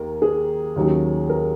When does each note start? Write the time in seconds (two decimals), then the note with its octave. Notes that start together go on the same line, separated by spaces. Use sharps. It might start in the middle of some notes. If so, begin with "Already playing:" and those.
Already playing: D#2 A#4
0.22 G#4
0.76 D#2 D#3 F#3 C#4
1.29 A#4